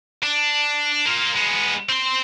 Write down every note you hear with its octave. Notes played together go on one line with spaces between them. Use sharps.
D4
A#3 F4
G#3 B3
C4 C6